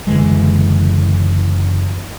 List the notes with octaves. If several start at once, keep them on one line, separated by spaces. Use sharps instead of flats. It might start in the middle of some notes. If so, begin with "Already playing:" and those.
F#1 D3 E3 G#3